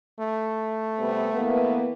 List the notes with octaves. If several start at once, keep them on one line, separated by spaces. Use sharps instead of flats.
A3
C3 G3 B3
E3 A#3 B3